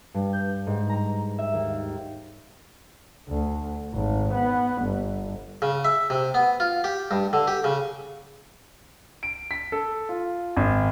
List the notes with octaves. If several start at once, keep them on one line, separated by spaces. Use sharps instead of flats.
G2
G6
G#2
A#5
E5
D#2
D2
G#1
B3
G1
C#3
E5
C3
B3
F4
G4
G2
D3
G4
C#3
D7
B6
A4
F4
G#1